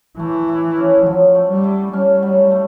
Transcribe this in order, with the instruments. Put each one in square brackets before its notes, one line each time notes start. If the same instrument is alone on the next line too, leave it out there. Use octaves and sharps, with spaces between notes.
[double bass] E3 [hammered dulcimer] A3
[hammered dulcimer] E4
C#4
[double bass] F3 [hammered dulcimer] F#3
[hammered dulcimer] A3
[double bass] G3
[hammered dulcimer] E4
[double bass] G3 [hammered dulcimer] C#4
[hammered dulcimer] F#3
A3